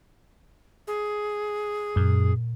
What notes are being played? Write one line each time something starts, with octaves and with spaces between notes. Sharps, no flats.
G#4
F#2 A#2